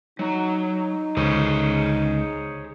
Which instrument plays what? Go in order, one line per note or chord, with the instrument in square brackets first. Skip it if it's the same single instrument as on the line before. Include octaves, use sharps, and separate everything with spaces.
[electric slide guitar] F#3 [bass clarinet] D#4
[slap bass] C#2 D3 [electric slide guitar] G#4 C5 C#5